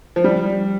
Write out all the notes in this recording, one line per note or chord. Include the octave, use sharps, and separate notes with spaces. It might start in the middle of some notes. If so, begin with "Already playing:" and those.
F3
G3